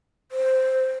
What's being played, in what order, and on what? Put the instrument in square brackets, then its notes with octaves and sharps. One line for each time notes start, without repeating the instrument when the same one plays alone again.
[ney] C5